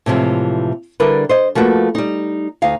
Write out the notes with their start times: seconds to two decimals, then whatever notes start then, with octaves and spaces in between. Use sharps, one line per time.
0.06 A2 C3 E3 F3 G#3
1.00 D3 G3 D4 E4 A#4 B4
1.29 C5 D#5
1.55 F3 A3 A#3 F#4 B4
1.95 G3 D#4
2.62 D2 D#4 F5